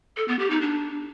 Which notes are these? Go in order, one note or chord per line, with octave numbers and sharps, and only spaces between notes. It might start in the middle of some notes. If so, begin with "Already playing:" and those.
A4
B3
G4
D#4
D4